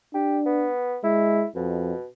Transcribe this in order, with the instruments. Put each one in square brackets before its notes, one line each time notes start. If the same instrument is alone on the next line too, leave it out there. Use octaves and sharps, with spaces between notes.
[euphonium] D4 [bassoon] G4
[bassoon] B3
[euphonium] G#3 [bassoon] E4
[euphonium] F2 [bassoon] B2